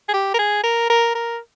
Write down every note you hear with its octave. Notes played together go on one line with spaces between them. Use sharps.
G#4
G4
A#4
G#4
A#4
A#4
A#4